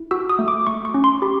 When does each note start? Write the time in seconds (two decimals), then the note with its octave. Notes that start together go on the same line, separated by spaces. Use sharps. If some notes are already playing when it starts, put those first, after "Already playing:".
Already playing: E4
0.11 F#4 E6
0.30 D#6
0.39 A3
0.48 D6
0.67 A3 C#6
0.85 C#6
0.94 C#4
1.04 C6
1.22 G4 B5